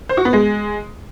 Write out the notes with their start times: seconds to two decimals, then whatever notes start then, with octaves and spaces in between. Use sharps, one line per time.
0.09 C5
0.17 F#4
0.25 B3
0.33 G#3